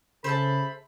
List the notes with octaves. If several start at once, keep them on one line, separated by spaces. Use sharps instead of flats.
C#3 G#4 A4 C5 E5 A5 B5